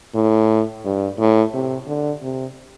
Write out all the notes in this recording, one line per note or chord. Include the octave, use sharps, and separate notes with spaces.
A2
G2
A2
C3
D3
C3